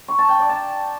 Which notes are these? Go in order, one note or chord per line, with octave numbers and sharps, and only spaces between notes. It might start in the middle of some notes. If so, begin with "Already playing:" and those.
C#6
A5
G5
D5
A5